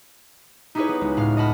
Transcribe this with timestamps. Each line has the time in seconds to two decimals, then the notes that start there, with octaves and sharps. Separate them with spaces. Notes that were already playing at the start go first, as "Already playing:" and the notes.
0.75 D#4 E4 G4 G#4 B4 C#5
0.89 B3
1.01 C#2
1.17 A2 F5 F6
1.37 D#5 F#5 A5 B5 F6